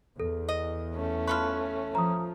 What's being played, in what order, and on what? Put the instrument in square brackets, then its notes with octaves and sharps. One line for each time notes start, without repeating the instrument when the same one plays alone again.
[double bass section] E2 [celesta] A4
[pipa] D#5
[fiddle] A3 C#4
[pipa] F4 A4 B4 [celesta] C#6 F6
[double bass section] F3 [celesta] A#5 D#6